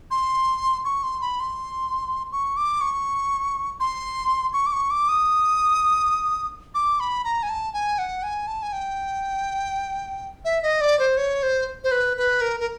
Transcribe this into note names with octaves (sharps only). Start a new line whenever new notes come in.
C6
C#6
C6
B5
C6
C#6
D6
C#6
C6
C#6
D6
C#6
D6
D#6
D6
B5
A#5
G#5
A5
G#5
F#5
G#5
A5
G#5
G5
E5
D#5
D5
C5
C#5
C5
C5
B4
B4
A#4
A#4